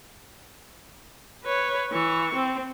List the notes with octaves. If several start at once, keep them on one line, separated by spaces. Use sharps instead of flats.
B4 C#5
E3 C#6
C4